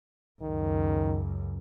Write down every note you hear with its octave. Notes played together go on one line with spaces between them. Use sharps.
C#2 F#2 D#3